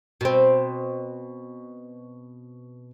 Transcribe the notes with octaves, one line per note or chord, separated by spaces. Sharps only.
B2 C4